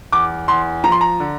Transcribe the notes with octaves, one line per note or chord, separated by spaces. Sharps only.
E2 D6
E2 C6
F3 A#5
C6
A#5
D3